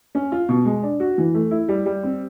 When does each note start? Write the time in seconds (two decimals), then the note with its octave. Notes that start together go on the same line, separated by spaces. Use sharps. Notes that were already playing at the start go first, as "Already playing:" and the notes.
0.15 C#4
0.32 F4
0.49 B2
0.65 G#3
0.83 D4
1.00 F#4
1.18 E3
1.34 A3
1.51 E4
1.68 G3
1.86 G3
2.03 C4